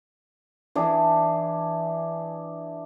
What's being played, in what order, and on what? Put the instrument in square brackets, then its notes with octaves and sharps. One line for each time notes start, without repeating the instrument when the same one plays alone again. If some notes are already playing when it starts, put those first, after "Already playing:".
[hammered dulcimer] E3 D4 G#4